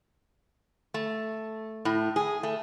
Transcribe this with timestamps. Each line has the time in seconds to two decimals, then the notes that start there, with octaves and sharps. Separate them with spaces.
0.94 A3
1.85 A2
2.16 G#4
2.43 A3